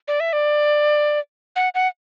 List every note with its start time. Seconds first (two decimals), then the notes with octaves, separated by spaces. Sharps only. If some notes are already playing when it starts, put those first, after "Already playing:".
0.08 D5
0.20 E5
0.33 D5
1.56 F#5
1.75 F#5